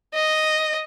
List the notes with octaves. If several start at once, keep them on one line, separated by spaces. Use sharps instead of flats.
D#5